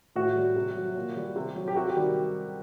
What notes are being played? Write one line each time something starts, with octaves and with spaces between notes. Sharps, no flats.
A2 F#4
G3
C3
F#3
A#2
G3
C3
F#3
G4
C3 F#4
G4
D#3 G3